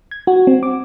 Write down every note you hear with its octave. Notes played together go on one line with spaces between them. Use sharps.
G#6
F#4
C4
D6